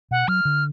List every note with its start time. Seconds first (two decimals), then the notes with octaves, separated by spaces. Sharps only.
0.11 B2 F#5
0.28 F#3 F6
0.45 D3